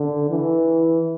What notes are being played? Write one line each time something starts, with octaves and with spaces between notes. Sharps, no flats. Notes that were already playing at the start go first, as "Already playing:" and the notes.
Already playing: D3
E3